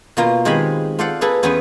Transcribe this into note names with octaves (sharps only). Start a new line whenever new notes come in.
B2 A#3 F4 A#5
D#3 G#3 C4 G4 G#5 B5
F4 A4 C5 D5 F5 F#5
A#3 G#4 A4 B4
E2 B3 C#4 G#4 B4 C5